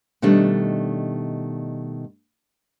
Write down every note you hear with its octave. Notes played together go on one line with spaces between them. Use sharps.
B2 D#3 G3 A3 D4